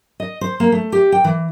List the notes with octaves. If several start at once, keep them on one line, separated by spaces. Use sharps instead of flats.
D#5
C5
A#3
A3
G4
G5
E3